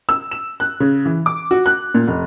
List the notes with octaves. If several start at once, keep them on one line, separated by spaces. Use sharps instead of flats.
E6
E7
F#6
C#3
E3
D6
F#4
F#6
A#2
F1